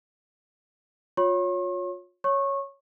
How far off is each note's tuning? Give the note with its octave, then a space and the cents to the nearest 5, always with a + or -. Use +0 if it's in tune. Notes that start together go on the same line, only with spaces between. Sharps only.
F4 +35 C#5 +0 C#6 -45
C#5 +0 C#6 -20